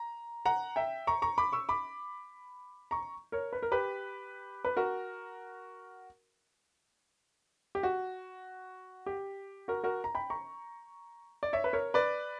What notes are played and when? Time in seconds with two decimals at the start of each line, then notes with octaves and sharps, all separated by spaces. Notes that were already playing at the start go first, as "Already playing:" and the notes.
Already playing: A#5
0.45 F#5 A#5
0.76 E5 G5
1.07 A#5 C#6
1.22 A#5 C#6
1.38 B5 D6
1.53 C#6 E6
1.69 B5 D6
2.91 A#5 C#6
3.32 A#4 C#5
3.53 B4
3.63 A#4
3.72 G4 B4
4.65 B4
4.77 F#4 A#4
7.75 G4
7.83 F#4
9.06 G4
9.68 F#4 A#4
9.84 F#4 A#4
10.04 A#5
10.15 G5 B5
10.30 A#5 C#6
11.43 D5
11.53 C#5 E5
11.64 B4
11.73 A#4 C#5
11.94 B4 D5